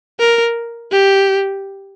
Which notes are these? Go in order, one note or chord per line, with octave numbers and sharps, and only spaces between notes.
A#4
G4